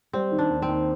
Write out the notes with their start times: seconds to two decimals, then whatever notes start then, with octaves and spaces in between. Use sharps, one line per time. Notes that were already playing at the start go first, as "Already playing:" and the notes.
0.13 G3 C4
0.32 D#3
0.39 D4
0.50 D#2
0.62 C4
0.69 D#2